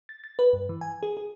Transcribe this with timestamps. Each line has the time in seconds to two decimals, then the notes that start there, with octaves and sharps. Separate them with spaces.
0.09 A6
0.24 A6
0.39 B4
0.53 G2
0.69 E3
0.81 G#5
1.03 G#4
1.17 G#4